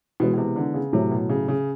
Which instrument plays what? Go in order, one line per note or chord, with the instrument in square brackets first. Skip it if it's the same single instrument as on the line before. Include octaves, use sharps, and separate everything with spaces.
[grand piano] B2 [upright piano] E3 G#3 B3
[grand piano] B2
C3
D3
C#3
[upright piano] A2 F#3 A3 [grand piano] C3
[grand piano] B2
C#3
C#3